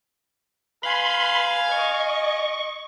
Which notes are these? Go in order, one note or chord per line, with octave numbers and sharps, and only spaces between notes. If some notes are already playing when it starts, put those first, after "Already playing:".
B4 F5 G#5 B5 C6
D#5 C#6